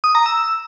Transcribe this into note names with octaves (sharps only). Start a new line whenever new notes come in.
D#6
A#5
E6